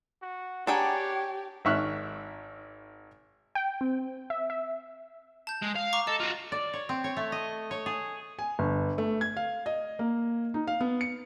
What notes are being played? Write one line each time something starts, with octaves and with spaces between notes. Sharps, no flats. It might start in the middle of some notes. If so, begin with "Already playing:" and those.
F#4
D4 G4 G#4 C#5 F#5 G5 A#5 B5
G#1 D#3 E5 C#6 F6 F#6
G5
C4
E5
E5
A5 G6
G#3
F5
A#5 C#6 D6
A4 D#5
F4 F#4
D5
C#5
C4
C#5
A3
D#5
C#5
G#4
G#5
G1
A3
G#6
F5
D#5
A#3
D#4
F5
B3
C#7